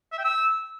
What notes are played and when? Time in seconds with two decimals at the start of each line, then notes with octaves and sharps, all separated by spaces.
0.12 E5
0.18 G5
0.24 E6